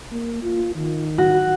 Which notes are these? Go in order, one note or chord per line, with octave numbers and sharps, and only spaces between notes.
A#3
F4
D#3
F#4